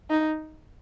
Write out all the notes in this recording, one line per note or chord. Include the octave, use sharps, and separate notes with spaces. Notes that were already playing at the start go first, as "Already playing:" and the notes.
D#4